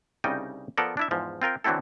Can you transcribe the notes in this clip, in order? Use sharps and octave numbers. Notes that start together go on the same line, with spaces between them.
C2 C#3 G3 D#4 D#5 G5
F3 B3 A4 A#4 D5
D4 E4 E5
E2 G#2 F3
C4 F4 A#4 G5
D3 E3 F#3 C4 E4 A4